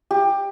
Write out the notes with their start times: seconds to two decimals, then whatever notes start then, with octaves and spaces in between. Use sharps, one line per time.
0.11 G4